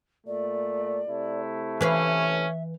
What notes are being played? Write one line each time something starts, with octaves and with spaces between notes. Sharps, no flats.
A#2 A3 D5
C3 A3 E4
E3 C#4 B4 E5 F5